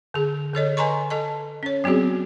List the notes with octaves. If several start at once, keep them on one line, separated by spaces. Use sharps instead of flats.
D3 G#4
D3 A4 C#5 D#5
B4 D#5 G#5 A#5 C6 C#6
A4 D#5 A5
C#4 C#5
F#3 B3 C4 F#4 G#4